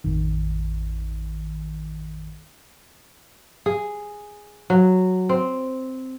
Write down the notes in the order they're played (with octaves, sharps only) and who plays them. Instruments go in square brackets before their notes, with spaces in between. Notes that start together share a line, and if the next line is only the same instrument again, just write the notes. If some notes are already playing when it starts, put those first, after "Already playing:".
[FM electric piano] A1 F2 D#3
[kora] G#4
F#3
C4